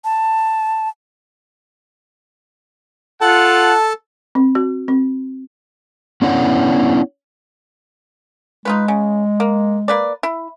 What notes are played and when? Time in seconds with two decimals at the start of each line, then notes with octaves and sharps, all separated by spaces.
0.05 A5
3.21 F4 A4 F#5 A5
4.35 C4
4.55 F#4
4.88 C4
6.22 B3 C#4 D4 E4 C#5 F#5
8.65 G#3 D#4 F4 B4
8.88 C#3
9.40 A#3
9.88 A#3 B4 D5
10.23 E4